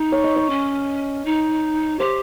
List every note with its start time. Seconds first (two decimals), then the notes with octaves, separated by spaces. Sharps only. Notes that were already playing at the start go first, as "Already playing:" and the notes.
Already playing: D#4
0.12 C#5
0.24 D#5
0.36 C#5
0.50 C#4
1.25 D#4
1.99 G4 C5